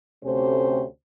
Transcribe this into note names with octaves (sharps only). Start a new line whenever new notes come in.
D2 C3 A3 C#4 G4 C5